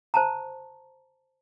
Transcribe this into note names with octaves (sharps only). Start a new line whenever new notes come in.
C5 A5 A#5